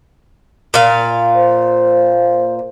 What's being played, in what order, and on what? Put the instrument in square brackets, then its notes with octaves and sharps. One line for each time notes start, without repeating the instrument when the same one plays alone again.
[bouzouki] A#2 F5
[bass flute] C5